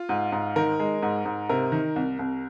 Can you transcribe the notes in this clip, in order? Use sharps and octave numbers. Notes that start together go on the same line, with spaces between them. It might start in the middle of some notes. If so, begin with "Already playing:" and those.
Already playing: F4
G#2
G#2
D#3 A#4
G#3
G#2
G#2
C3 A#4
D#3
C2
C2